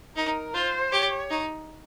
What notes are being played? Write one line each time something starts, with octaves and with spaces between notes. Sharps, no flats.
D#4 A#4
F4 C5
G4 C#5
D#4